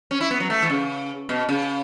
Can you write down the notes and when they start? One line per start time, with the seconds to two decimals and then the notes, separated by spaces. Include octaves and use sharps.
0.11 C#4
0.21 E4
0.31 B3
0.40 F#3
0.50 A3
0.62 E3
0.70 C#3
1.29 B2
1.49 C#3